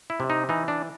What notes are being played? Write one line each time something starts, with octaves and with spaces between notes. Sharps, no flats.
E4
C3
D#4
E3 D#4
D4